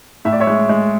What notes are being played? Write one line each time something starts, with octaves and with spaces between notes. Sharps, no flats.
A2 E5
D5
C#5 E5
G#3
G#3